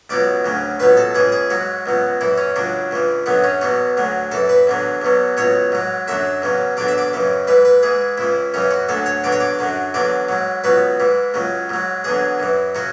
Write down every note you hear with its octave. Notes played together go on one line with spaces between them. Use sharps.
C#2 B2 F#3 D5
D2 C#3 F#3
C#2 B2 F#3 B4
A4
C#2 C#3 E3 G#4
G#4
G#2 F#3 F#4
C#2 B2 F#3
F#2 E3 E4
C#4
C#2 C#3 F#3 D4
C#2 C#3 E3
F#2 D3 F#3 B3
C#4
E2 B2 F#3 F#4
D2 D3 F#3
F#2 E3 A4
B4
E2 D3 F#3
E2 B2 F#3
C#2 B2 F#3 C#5
G#2 F#3
F#2 D3 F#3 E5
E2 C#3 F#3
E2 D3 F#3 D5
E5
D5
F#2 C#3 E3
G#2 E3 B4
B4
G#2 E3 G#4
C#2 C#3 E3 E4
F#2 C#3 E3 C#4
F#4
D2 D3 F#3 A4
C#5
E2 D3 F#3 D5
C#5
D5
F#2 D3 F#3
E2 D3 F#3 D5
G#2 F#3
C#2 B2 F#3 B4
G#2 E3
C#2 C#3 F#3
G#2 F#3
E2 D3 F#3 G#4
F#2 E3
C#3 F#3 F#4